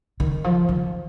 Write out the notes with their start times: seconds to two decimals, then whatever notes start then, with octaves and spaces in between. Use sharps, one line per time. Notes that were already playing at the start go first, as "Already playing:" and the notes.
0.20 D#3
0.44 F3
0.69 D#3